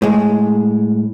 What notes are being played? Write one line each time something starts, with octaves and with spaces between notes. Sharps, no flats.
A2 G#3